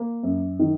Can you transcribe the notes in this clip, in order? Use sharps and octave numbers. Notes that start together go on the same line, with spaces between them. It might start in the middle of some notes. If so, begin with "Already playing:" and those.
Already playing: A#3
F#2
D#3